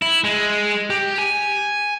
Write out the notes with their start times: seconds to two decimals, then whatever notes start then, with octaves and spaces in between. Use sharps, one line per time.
0.02 E4
0.24 G#3
0.90 G4
1.18 G#5